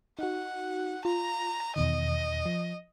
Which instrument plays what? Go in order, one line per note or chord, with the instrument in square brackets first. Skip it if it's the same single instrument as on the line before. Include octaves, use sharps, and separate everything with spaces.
[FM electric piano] D#4 F#4 [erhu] F#5
[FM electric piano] F4 [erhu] A#5
[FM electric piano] E2 B2 D#3 [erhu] D#5
[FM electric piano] F3